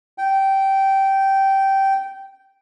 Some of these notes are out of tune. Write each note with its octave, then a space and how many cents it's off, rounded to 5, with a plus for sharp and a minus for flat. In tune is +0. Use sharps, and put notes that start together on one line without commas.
G5 -15